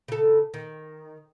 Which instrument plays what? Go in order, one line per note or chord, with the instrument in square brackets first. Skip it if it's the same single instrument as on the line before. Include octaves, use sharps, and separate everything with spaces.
[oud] C#3 A4
D#3